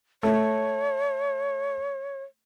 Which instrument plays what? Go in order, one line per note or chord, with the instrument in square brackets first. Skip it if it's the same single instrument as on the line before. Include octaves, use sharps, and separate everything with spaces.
[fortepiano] A3 [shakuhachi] C#5